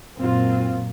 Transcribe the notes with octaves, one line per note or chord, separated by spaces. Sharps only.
F#2 A#2 C4 F4